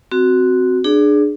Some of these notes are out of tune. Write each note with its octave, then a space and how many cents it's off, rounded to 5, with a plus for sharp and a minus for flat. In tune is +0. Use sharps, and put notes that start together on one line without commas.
C4 -10 F#4 +0
D4 +20 G#4 +5 D5 -25